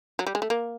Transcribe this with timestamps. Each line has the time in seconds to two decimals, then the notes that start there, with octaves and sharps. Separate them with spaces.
0.19 F#3
0.27 G3
0.35 G#3
0.42 A3
0.50 A#3